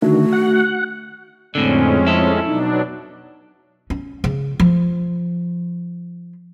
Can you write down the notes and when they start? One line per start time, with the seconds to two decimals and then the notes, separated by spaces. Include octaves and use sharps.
0.02 D3 D#3 A3 F#4
0.33 F#5
1.55 F2 A2 D3 G#3 C4 C#4
2.07 E4 A4
2.46 B2 F#3 D4 D#4
3.90 C#4
4.24 C#3
4.60 F3